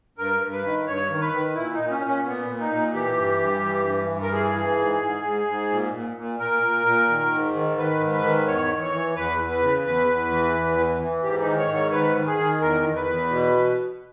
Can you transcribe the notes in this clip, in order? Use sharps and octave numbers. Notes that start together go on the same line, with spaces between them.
G2 A#4
G2
B4
D#3
G2 C#5
D#3
B4
D#3
A#2 E4
D#4
A#2
C#4
A#2
C#4
A#2 B3
A#2
D#4
A#2
E3 G4
G2
G2
E3
G2
G2
A#4
E3 G#4
E3
G#2
G#2
G#2
G#2
A#2
A#2
A#2
A#2 A#4
A#2
A#2
D#3
G#2
D#3
D#3 B4
G#2
B4
D#3
E2 C#5
E2
C#5
E3
E2 B4
E2
B4
C#3
E2 B4
E2
E3
E2
E3
E3
G#2 G4
D#4
D#3
C#5
G#2
C#5
D#3 B4
D#3
G#4
D#3
E2 A#4
E2
B4
E2
B2